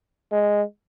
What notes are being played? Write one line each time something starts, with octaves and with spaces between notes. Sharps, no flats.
G#3